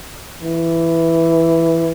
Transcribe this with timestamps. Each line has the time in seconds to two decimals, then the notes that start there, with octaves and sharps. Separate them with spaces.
0.43 E3